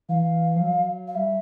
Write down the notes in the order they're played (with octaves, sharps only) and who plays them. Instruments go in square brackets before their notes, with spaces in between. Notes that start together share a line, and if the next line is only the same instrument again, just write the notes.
[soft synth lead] E3 [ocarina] F5
[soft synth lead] F3
F#3
[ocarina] F5
[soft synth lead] G3 [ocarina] E5